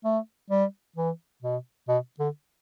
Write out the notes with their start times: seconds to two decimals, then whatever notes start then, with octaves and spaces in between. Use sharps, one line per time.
0.05 A3
0.51 G3
0.96 E3
1.42 B2
1.88 B2
2.19 D3